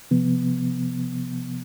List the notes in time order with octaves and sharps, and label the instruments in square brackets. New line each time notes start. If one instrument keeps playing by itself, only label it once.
[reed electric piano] C3 F3 B3